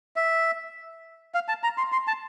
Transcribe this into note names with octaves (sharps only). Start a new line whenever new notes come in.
E5
F5
A5
A#5
C6
C6
A5